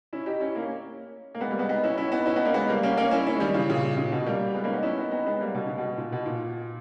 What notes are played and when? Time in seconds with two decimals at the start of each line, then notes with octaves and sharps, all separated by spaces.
0.13 C#4 E4
0.26 D#4 G4
0.40 C#4 E4
0.55 A#3 C#4
1.35 A#3
1.40 G#3 B3
1.50 G3 A#3
1.59 G#3 B3
1.69 B3 D#4
1.84 C#4 E4
1.97 C#4 E4
2.12 B3 D#4
2.26 C#4 E4
2.36 B3 D#4
2.45 A#3 C#4
2.54 G#3 B3
2.69 G3 A#3
2.83 A#3 C#4
2.97 A#3 C#4
3.11 C#4 E4
3.26 C#4 E4
3.34 G#3
3.40 D#3 G3
3.54 C#3 E3
3.70 A#2 C#3
3.97 A#2 C#3
4.12 B2
4.26 G3 A#3
4.55 G#3 B3
4.64 A#3 C#4
4.73 B3 D#4
4.83 C#4 E4
4.97 B3 D#4
5.11 B3 D#4
5.27 G#3 B3
5.41 G3 A#3
5.54 B2
5.66 C#3
5.78 B2
5.98 A#2
6.12 B2
6.26 A#2